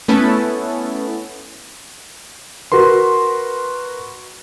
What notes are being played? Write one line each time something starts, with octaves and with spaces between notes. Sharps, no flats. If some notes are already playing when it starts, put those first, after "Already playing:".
A3 B3 C#4 E4 A4 B4
F#4 A#4 B4 C6